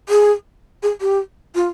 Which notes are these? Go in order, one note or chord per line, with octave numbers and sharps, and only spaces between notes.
G#4
G#4
G4
F4